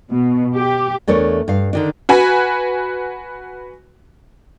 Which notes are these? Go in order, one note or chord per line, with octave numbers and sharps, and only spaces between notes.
B2
G4
E2 A3 D4 A#4 C#5
G2 F5
D3 D#3 D4
F#4 B4 G#5